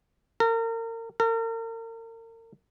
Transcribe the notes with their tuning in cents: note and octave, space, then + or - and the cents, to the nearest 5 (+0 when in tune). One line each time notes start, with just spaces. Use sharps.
A#4 -35
A#4 -40